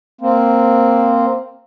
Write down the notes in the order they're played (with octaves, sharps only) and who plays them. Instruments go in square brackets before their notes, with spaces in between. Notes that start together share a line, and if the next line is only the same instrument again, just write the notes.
[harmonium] A#3 C4